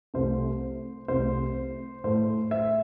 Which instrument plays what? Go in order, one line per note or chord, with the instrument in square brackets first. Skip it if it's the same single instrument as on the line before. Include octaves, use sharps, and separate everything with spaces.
[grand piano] C2 C3 A3 C5
C2 C3 A3 C5
A2 A3 C5
E5